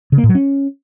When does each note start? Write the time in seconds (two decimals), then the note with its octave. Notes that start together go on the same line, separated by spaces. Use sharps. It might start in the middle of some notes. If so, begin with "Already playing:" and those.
0.12 C#3
0.18 A#3
0.24 A2
0.29 F#3
0.35 C#4